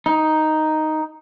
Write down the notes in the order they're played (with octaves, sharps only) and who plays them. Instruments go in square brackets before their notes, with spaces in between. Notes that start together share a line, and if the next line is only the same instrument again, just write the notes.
[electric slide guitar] D#4